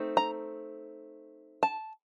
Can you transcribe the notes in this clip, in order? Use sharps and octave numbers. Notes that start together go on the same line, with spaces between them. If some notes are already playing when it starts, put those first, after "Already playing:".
Already playing: A3 C4 D#4
A#5
A5